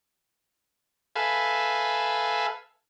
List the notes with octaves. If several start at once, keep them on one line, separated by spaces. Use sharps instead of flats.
A4 B4 E5 F5 G#5